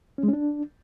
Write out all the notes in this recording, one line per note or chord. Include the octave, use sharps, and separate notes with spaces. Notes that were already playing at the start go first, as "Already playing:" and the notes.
C#4
G#3
C#4
D4